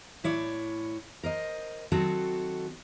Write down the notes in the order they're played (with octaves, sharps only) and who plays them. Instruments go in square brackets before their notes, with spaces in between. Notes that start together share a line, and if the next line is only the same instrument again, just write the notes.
[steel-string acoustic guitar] A2 E4 C#5 D5
A#4 C5 D#5
D#3 F#3 C4 F#4 A4